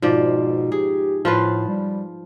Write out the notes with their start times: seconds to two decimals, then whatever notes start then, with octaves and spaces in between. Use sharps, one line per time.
0.02 G#2 B2 F3 D5
0.72 G4 G#4
1.25 A2 F3 F4 B4
1.68 G3